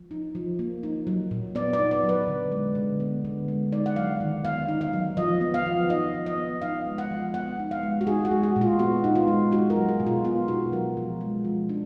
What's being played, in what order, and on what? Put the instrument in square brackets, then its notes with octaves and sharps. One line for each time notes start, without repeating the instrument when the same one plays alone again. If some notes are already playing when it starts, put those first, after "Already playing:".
Already playing: [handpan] F3
D#4
F3
A#3
D#4
F#3
A#2
B3 D5
D5
D#4
D5
F#3
B4
D3
G#3
D3
B3
D3
G#3
D#4 D5
F#5
F#3 F5
D#3
B3 F5
D#4
F5
F#3
F3 D#5
B3
F5
F3
D#4 D#5
F3
D#5
B3
D#4 F5
G#3
F#5
F3
B3 F#5
D#4
F5
G#3
F#4
D#4 G#4
F#4
G#3
F#4
A#2
F4
B3 F#4
D#4
F4
G#3
D#4 F#4
A#4
F#3
G#4
B2
F4
B3 F4
D#4 F#4
F#3 A#4
F3
G#3
F3
D4